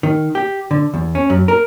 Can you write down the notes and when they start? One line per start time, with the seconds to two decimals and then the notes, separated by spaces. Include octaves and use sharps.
0.03 D#3
0.35 G4
0.71 D3
0.94 E2
1.15 C#4
1.30 F#2
1.48 A#4